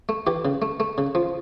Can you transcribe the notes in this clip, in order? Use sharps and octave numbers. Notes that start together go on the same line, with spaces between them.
A3
E3 G4
C#3
A3
A3
C#3
F3